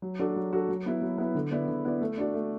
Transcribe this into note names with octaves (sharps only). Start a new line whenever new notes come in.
F#3
D4 F#4 A4
F#3
D4 F#4 A4
F#3
B3 E4 B4
F#3
B3 E4 B4
D3
B3 E4 D5
D3
B3 E4 D5
A3
D4 F#4 D5
A3